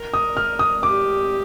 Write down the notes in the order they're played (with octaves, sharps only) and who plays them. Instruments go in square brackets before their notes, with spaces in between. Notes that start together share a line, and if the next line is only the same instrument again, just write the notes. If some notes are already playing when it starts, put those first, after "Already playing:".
Already playing: [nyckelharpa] A#4
[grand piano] D#6
F6
D#6
[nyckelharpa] G4 [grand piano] D6